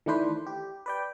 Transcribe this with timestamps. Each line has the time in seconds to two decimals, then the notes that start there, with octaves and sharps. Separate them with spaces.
0.06 D#3 E3 A3 D4 B4 C5
0.47 G4
0.86 B4 D5 G5